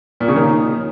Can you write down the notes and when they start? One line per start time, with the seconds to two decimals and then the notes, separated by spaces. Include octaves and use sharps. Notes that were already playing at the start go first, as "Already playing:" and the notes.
0.20 A#2
0.28 C#3
0.35 D#3 F3 A#3 D#4 A#4 C#5